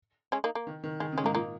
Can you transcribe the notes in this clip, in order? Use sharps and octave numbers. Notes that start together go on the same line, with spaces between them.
G#3 C#4
A#3 D#4
A#3
D#3
D#3
D#3 G#3
C#3
G#3 C#4
G#2 A#3 D#4
A#2 A#3 D#4